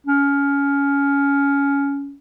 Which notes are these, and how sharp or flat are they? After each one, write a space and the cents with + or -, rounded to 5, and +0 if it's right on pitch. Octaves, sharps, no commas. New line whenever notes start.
C#4 +20